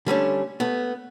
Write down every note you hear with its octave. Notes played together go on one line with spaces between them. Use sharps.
D3 G3 A3 C#4
A3 B3